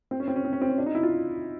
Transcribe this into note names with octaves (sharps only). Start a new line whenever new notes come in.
C4
C#4
C4
C#4
C4
C#4
C4
C#4
D4
D#4
E4
F4